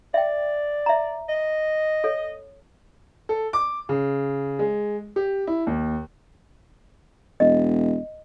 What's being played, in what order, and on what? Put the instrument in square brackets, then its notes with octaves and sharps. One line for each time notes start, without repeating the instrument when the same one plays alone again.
[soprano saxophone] D5 [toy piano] E5 G5
[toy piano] E5 A#5
[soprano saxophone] D#5
[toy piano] A4 C#5
[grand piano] A4
D6
C#3
G#3
G4
E4
D#2
[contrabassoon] E1 [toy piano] D#5